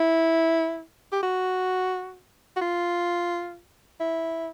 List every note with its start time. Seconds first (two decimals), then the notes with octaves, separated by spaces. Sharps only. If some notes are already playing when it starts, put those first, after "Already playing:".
Already playing: E4
1.12 G4
1.23 F#4
2.56 F#4
2.61 F4
4.00 E4